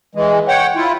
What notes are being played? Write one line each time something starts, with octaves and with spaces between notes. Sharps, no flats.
E3 G#3
C#5 F#5 G5
E4 F4